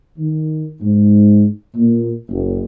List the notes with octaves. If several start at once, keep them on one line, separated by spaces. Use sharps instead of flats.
D#3
G#2
A#2
F#1